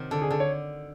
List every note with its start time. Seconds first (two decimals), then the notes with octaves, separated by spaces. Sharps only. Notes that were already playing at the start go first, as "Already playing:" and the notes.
Already playing: C3 D#3 F#3
0.11 D3 A4
0.22 G#4
0.30 D3 A4
0.40 C#5